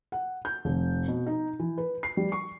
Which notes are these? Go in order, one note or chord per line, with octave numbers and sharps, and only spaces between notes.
F#5
G6
F1
B2
D#4
E3
B4
C7
G3
C#6